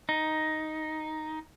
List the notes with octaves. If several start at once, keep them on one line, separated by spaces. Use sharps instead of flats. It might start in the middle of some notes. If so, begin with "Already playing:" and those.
D#4